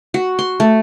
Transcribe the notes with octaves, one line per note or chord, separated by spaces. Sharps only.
F#4
C6
A3